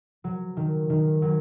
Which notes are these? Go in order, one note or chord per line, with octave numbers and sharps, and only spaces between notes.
F#3
D#3
D#3
F#3